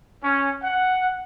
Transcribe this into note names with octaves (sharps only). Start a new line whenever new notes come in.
C#4
F#5